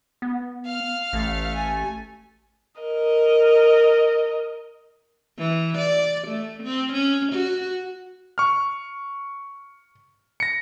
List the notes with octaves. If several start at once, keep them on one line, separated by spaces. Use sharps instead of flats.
B3
F5 F6
A1 A3
G#5
A#4 D#5
E3
D5
A3
C4
C#4
F#4
C#6 F6
A#6 C#7